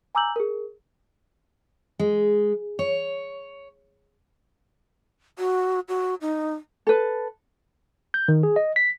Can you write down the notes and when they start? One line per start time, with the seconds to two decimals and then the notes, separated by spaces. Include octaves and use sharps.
0.15 G#5 A#5 D6 E6 G6 F#7
0.36 G#4 A#4
1.99 G#3
2.79 C#5
5.39 F#4
5.89 F#4
6.21 D#4
6.87 A4 B4
8.14 G6
8.28 D#3
8.43 G#4
8.56 D#5
8.76 B6